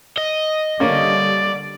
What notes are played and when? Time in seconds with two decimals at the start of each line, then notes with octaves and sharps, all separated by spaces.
0.17 D#5
0.80 D3 G3 A#3 C#4 D5